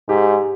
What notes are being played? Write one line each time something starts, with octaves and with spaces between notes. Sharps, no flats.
G#2 G4